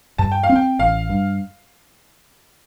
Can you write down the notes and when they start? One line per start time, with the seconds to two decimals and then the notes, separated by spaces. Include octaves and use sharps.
0.18 G2 A5
0.32 G5
0.43 F5
0.49 C4
0.55 G5
0.79 A1 F5
1.09 G2